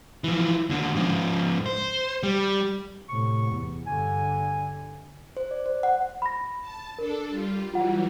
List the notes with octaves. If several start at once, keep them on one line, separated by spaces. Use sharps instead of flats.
E3 F3
D#2 D3
G#2 F3
C5
G3
A2 C3 C#6
E2
G2 D3 G#5
C5
D5
C5
F#5
B5 A#6
A5
D4 A4 A#4
G3 F4
E3 F#3 G3 F4 F#5